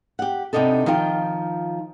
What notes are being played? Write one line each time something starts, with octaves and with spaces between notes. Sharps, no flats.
G4 F#5
C3 B3 D4 D#4 A4
D#3 F3 F4 G5